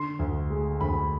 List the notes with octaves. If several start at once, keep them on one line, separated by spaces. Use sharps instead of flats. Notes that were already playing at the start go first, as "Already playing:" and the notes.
Already playing: D3 C6
D2
G#3
D2 B5